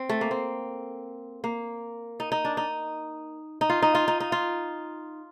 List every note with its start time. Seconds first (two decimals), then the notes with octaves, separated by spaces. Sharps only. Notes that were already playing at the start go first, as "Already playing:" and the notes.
Already playing: C4
0.09 A3
0.21 A#3
0.31 C4
1.44 A#3
2.20 D#4
2.32 D#4
2.45 D4
2.57 D#4
3.61 D#4
3.70 F4
3.82 D#4
3.95 F4
4.08 D#4
4.20 D#4
4.32 F4